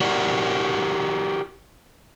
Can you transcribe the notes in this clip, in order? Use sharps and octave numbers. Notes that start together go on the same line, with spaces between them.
E4 F#4 G4 A#4 D5 F#5